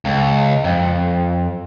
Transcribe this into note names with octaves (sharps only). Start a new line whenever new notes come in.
C#2
F2